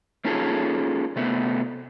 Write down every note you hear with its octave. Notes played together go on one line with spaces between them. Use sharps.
A#3 C#4 D#4 F4 G#4 A4
C3 A3 B3